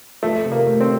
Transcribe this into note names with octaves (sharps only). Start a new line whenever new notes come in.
F3 A3
C3
A#3
A3
C4